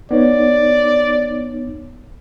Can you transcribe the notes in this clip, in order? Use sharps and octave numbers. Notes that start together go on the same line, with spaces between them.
B3 D#4 C#5 D5